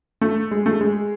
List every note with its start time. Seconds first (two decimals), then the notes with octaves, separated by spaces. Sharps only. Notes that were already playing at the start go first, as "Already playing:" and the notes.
0.21 A3
0.51 G#3
0.66 A3
0.81 G#3